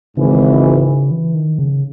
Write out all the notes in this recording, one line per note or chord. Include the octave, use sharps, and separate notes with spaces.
G#1 G#2 C#3 E3
E3
D#3
C#3